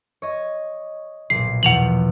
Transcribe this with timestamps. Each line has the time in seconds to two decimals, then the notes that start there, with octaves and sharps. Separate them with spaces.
0.22 C#5 D#5 C#6
1.30 B1 A#2 C7
1.63 E2 B2 F3 F#5 F7 F#7